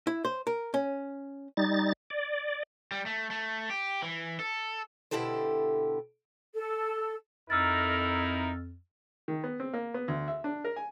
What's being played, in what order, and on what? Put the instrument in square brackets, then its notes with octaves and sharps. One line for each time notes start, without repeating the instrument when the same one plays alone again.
[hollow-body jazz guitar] E4
C5
A#4
C#4
[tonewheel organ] G3 D#4 A6
D5
[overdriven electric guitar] G3
A3
A3
G4
E3
A4
[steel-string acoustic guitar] B2 D3 E4 G4 A4 C5
[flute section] A4
[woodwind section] F2 [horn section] D#4 E4 A#4 [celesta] E6 F6 A6
[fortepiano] D#3
B3
C4
A#3
B3
D2
E5
D4
A#4
G#5